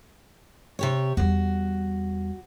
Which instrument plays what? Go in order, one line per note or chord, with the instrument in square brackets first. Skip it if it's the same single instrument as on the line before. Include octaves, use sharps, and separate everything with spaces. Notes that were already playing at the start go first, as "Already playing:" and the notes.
[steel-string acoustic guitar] C3 G4 C#5
[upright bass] E2 G3 [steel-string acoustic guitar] F#4